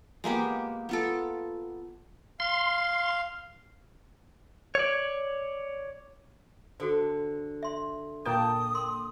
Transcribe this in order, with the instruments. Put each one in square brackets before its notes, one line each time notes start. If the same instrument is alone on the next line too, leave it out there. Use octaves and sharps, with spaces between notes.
[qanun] G#3 A#3 B3 G4
B3 F4 A4
[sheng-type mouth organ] F5 [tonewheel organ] C6
[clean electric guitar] C#5 D5
[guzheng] D3 [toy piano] F#4 A4 C5
[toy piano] E5 C6
[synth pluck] A#2 A#3 G5 [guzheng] A5 [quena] D#6
[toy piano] C6